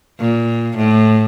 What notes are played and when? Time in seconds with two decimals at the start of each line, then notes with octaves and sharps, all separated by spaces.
0.19 A#2
0.77 A2